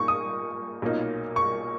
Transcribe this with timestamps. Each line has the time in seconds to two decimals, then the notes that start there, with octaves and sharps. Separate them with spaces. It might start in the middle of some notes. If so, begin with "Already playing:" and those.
Already playing: A#2 A#3 D#4 C#6
0.08 D#6
0.82 B1 A#2 A#3 D#4
1.36 C#6